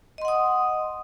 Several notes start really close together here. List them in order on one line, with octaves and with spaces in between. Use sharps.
D#5 C6 F#5 D#6